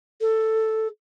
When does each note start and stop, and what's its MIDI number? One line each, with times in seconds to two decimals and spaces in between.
0.21 0.87 69